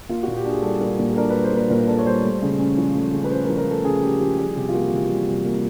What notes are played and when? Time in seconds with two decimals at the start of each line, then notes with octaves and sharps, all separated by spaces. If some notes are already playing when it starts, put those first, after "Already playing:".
0.09 A#3 F4
0.23 A#2 F#4
0.36 G4
0.45 D4 G#4
0.62 G3 A4
0.81 A#3
0.99 A#2
1.11 A4
1.17 D4 A#4
1.30 G3 B4
1.43 C5
1.52 A#3 B4
1.70 A#2 A#4
1.88 D4 A4
1.99 C#5
2.06 G3 C5
2.24 A3
2.42 C#3
2.59 C#4
2.77 F3
2.95 A3
3.13 C#3
3.24 B4
3.31 C#4 C5
3.44 A#4
3.49 F3
3.57 A#4
3.67 A3 A4
3.84 C#3 G#4
4.02 C#4 G4
4.20 F3 G4
4.38 G3 G#4
4.56 C3 G4
4.69 F4
4.74 A#3 F#4
4.92 E3 G4
5.09 G3
5.27 C3
5.45 A#3